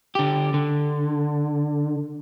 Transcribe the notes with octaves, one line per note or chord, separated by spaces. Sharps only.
D3 G4
D3